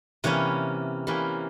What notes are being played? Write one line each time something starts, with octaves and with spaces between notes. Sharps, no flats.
C3 E3 A#3 C#4 E4 C#5
C3 E3 A#3 C#4 E4